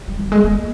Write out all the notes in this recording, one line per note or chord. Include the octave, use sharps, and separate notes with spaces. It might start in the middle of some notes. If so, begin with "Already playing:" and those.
G3
G3
G#3
A#3